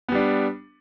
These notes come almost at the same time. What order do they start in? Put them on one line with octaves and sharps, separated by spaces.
B3 G3 D4